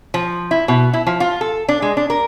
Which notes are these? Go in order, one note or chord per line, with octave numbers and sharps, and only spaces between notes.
F3
E4
B2
E4
F3
F4
A4
D4
G#3
D4
A#4